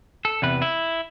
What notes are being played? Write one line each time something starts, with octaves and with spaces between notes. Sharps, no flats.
A4
E2 C3 B4
E4